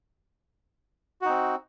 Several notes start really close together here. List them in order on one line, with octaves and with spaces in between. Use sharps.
F#4 D#4 C4